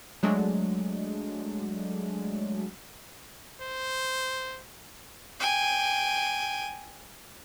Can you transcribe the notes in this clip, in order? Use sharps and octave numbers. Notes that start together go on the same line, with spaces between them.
F#3 G#3 A3 D4
C5
G5 G#5